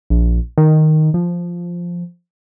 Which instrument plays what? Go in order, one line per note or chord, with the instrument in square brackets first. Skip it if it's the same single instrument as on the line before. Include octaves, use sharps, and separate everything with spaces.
[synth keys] A#1
D#3
F3